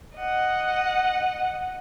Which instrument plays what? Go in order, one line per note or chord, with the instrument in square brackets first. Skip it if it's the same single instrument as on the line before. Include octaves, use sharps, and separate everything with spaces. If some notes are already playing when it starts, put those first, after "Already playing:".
[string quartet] D#5 F#5